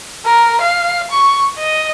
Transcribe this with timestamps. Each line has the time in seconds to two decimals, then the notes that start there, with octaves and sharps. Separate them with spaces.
0.25 A#4
0.61 F5
1.11 C#6
1.58 D#5